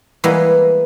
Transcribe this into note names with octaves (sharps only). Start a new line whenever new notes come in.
E3 G3 G#3 A#3 B3